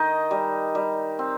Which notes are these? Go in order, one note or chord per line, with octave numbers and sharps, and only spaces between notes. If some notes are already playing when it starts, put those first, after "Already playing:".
Already playing: D#3 D#4 D#5
G3
G3
C4